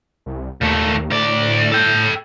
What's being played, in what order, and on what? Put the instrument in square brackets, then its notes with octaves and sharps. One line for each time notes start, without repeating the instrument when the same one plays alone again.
[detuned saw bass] C2
[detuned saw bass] D#2 [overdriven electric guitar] A#2 A3
[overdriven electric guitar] D2 D5 [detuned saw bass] A2
[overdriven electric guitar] A4 G5